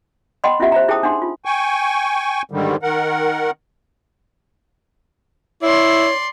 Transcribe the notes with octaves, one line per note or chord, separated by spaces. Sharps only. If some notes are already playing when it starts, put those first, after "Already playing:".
D#5 F#5 G5 B5 C6
C#4 E4 F4 G4 E5 F#5
C5 E5 A#5
E4 G#4 C5 G5 A5 D#6
D4 D#4 G#4 F#5 C6
F4
G5 G#5 C#6
G#2 D3 D#3 G3
D#3 A#4 F#5
E4 C#5 D5 C6